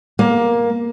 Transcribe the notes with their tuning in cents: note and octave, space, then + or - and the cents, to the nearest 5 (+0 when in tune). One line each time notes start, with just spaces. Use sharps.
A#3 +15